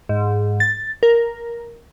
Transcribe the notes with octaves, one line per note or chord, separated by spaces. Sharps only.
G#2
A6
A#4